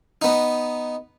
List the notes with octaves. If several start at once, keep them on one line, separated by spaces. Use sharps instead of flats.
B3 D#4